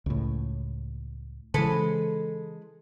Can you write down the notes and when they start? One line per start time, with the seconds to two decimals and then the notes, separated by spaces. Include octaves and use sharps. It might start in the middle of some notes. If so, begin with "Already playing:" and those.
0.06 C#2 A2
1.54 C#3 E3 G#3 A4 B4